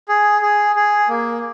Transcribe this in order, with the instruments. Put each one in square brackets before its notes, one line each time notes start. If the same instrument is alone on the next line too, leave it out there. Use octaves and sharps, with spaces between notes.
[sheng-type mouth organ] G#4
G#4
G#4
A#3